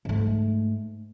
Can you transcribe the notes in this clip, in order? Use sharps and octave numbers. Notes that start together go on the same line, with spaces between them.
G#2 A3